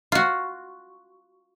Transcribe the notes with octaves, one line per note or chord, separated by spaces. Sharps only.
F4 F#4